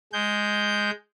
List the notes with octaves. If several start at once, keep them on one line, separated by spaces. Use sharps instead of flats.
G#3 G6